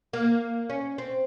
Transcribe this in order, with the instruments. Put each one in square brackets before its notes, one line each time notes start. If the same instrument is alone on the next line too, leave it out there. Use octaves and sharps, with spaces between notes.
[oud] A#3
C#4
C4